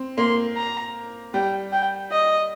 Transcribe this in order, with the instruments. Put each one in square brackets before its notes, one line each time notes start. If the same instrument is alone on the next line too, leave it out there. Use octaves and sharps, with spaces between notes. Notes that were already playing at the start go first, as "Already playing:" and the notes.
Already playing: [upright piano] C4
[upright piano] A#3 [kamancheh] C6
[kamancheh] A#5
[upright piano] G3 [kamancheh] G5
[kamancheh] G5
D#5